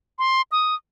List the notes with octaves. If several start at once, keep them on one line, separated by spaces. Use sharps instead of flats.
C6
D#6